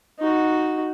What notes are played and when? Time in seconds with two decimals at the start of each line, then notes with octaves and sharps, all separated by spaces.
0.20 D#4 F#4